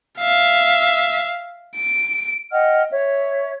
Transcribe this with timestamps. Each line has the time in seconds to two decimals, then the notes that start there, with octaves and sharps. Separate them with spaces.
0.19 E5 F5
1.76 D7
2.52 D#5 F#5 G5 F6
2.91 C#5 E5